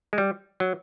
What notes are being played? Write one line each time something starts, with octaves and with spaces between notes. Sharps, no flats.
G#3
G3
F#3